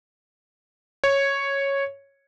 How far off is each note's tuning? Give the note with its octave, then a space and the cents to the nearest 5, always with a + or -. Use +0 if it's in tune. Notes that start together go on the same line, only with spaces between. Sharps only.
C#5 -5